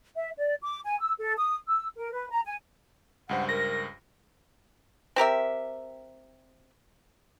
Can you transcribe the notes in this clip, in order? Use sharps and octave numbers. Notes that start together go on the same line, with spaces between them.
E5
D5
D6
G#5
E6
A4
D#6
E6
A#4
B4
A#5
G#5
C#2 G2 C5 F#5
A#4 A#6
C4 G4 A#4 E5